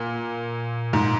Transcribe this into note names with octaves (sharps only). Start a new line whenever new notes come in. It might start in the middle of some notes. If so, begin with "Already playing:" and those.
Already playing: A#2
G#2